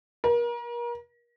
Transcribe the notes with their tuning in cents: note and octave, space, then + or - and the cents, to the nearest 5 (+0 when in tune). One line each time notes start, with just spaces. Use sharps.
A#4 +35